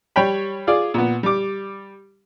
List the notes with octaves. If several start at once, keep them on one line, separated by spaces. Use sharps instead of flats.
G3 C#5 G5 B5
F4 G#4 D5
A#2 B3
G3 D6